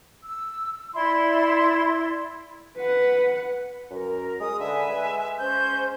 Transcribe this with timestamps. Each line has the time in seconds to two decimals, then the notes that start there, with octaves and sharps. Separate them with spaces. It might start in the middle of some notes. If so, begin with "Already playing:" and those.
0.23 E6
0.94 E4 D5 C6
2.76 B4 F#5
3.90 F#2 A#4
4.40 G#3 D#6
4.60 D3 B4 E5 G#5
4.90 G#3
5.38 C#4 C5 G6